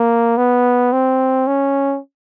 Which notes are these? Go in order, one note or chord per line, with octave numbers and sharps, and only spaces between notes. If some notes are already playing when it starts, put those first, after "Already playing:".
Already playing: A#3
B3
C4
C#4